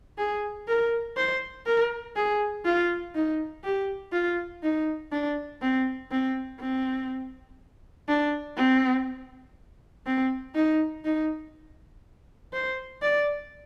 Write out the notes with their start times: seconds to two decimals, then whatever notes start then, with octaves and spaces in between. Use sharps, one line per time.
0.18 G#4
0.68 A#4
1.17 C5
1.66 A#4
2.16 G#4
2.66 F4
3.15 D#4
3.64 G4
4.13 F4
4.63 D#4
5.12 D4
5.62 C4
6.11 C4
6.60 C4
8.08 D4
8.57 C4
10.06 C4
10.55 D#4
11.05 D#4
12.53 C5
13.02 D5